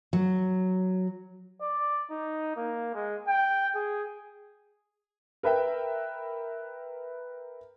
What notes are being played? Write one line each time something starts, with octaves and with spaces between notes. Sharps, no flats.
F#3
D5
D#4
A#3
G#3
G5
G#4
A#4 B4 E5 G5